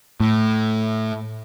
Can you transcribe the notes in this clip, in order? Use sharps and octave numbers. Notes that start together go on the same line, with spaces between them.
A2